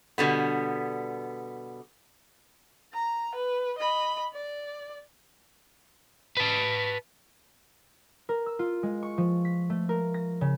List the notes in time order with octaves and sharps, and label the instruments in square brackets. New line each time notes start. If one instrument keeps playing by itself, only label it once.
[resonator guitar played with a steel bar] B2 D3 G3 B3
[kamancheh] A#5
B4
D#5 B5
D5
[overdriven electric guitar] B4 A5
[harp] A#4
E6
F4
G#3
C#6
F3
B6
A3
A#4
A#6
C#3